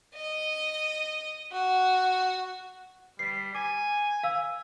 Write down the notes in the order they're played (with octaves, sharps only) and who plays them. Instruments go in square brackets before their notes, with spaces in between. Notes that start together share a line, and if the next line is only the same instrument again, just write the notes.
[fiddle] D#5
F#4
[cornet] G3 [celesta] B6 C7
[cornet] G#5 [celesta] D6
[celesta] F5 E6